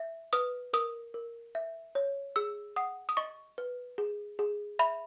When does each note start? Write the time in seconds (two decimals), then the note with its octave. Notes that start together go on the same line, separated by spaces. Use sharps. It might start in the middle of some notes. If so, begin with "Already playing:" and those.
Already playing: E5
0.33 B4 D#6
0.73 A#4 D#6
1.14 A#4
1.55 E5
1.95 C#5
2.36 G#4 E6
2.76 F#5 D#6
3.09 D#6
3.17 D#5 C#6
3.58 B4
3.98 G#4
4.39 G#4
4.79 E5 B5